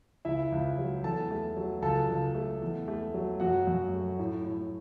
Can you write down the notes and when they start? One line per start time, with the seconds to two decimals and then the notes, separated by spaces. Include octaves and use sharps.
0.25 C#2 E4 E5
0.52 C#2
0.78 F#3
1.04 E2 A4 A5
1.31 A3
1.57 F#3
1.82 C#2 A4 A5
2.09 C#2
2.35 A3
2.62 E2
2.88 A3
3.14 F#3
3.40 F#2 F#4 F#5
3.67 F#2
3.93 A3
4.19 A2
4.45 A2